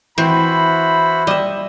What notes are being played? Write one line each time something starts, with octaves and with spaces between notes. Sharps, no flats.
E3 C4 E4 F#4 C5 B5
G3 D#5 E5